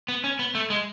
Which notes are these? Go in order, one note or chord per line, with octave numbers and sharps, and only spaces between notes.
B3
C#4
B3
A3
G#3